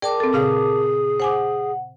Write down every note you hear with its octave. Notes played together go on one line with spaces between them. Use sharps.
G#4 A#4 D5 G5 A5 D6
C4 A4
A#2 C#3 G#4 F5
C5 F#5 G#5 D6